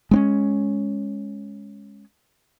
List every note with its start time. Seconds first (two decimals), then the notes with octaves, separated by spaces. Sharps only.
0.11 G#3 C4 C#4